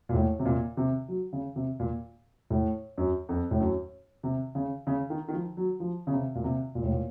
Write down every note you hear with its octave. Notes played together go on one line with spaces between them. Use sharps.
A#2
A2
C3
A#2
C3
F#3
C#3
C3
A#2
A2
F#2
F2
A2
F#2
C3
C#3
C#3
D#3
D#3
F3
F#3
F3
C#3
C3
A#2
C3
A#2
A2
A#2